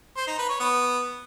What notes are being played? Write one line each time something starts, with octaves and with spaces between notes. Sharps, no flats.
C5
D#4
B4
C#5
B3